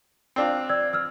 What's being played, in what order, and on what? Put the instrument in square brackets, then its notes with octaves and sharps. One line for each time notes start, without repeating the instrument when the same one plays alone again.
[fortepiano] C4 D4 F4
[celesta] D5 E6 G#6
E6 F6